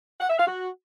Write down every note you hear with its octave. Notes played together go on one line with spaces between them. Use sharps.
F#5
E5
F5
F#4